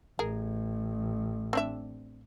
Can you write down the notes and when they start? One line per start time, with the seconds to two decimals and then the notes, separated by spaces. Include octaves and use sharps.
0.19 A1 G#4 A#4
1.53 C4 D4 E5